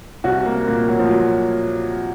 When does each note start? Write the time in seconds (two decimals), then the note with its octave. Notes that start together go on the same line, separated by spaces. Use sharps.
0.24 C2 F#4
0.46 A#3
0.67 A#2 A#3
0.88 F#3
0.99 F3
1.09 F#3